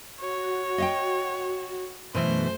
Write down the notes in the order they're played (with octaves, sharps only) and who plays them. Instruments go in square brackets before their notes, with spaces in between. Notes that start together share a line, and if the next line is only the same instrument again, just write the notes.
[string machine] F#4 [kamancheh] C#5
[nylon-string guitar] D#5 F5 G5
[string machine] F#2 A3 [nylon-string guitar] B2 E3 [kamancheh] C5